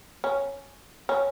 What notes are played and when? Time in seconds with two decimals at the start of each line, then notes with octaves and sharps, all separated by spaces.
0.24 C#4
1.09 C#4